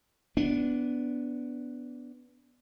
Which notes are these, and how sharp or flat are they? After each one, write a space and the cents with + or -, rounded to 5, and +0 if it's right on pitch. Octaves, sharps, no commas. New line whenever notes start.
B3 +0 D4 -15